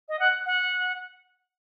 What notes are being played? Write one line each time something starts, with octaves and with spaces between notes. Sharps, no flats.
D#5
F#5
F#5